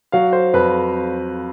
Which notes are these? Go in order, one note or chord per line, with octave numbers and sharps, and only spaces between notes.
F#3 F5
C5
F2 B4